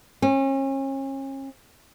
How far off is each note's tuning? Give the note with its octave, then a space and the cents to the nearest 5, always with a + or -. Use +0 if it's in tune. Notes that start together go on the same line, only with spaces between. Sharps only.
C#4 -35